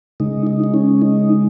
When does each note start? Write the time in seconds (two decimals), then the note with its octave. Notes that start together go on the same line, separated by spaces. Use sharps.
0.20 C#3 G#3 D#4
0.47 D#4
0.64 D#4
0.74 C#4
1.02 D#4